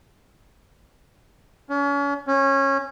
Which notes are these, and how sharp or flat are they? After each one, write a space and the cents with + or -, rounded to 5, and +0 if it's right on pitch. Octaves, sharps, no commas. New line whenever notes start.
C#4 +35
C#4 -20